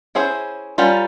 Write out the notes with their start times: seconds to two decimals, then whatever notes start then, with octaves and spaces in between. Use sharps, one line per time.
0.15 C#4 E4 G#4 C5
0.78 G3 C#4 F4 A#4